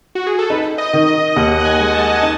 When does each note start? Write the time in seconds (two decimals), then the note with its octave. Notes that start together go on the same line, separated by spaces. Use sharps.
0.15 F#4
0.27 G#4
0.39 A4
0.50 D#4 B4
0.78 D#5
0.93 D#3
1.08 D#5
1.36 D#2 F#5
1.60 F#5
1.65 G#5
1.79 G#3
1.93 A5
2.12 A5
2.22 D#4 A5